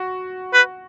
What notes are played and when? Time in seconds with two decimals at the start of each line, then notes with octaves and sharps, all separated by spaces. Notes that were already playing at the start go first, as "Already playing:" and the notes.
Already playing: F#4
0.54 B4